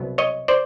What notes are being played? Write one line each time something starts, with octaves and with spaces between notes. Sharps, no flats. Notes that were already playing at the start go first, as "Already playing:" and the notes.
Already playing: C2 B2 F#3 B3
C#5 D#5
C5 D5